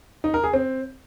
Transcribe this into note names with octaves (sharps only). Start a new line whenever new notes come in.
D#4
A#4
G#4
C4